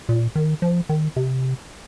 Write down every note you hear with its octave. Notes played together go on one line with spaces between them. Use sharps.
A#2
D#3
F3
D#3
C3